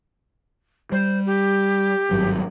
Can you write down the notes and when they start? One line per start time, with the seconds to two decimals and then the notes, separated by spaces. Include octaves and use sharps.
0.92 G3 C5
1.26 G4
2.11 G#1 G2 F#3